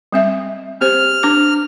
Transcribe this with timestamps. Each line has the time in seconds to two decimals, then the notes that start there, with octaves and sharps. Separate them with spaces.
0.12 G3 C4 E5
0.81 C4 G4 C5 F6
1.23 D4 D6